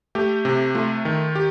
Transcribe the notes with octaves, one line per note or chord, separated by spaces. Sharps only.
A3 G4
C3
A3 F4
D#3
G4